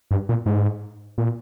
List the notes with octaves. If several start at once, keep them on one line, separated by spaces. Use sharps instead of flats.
G2
A#2
G#2
A#2